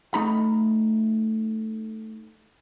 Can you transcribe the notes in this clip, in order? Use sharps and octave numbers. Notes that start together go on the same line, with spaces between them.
A3 D#4 A#5 B5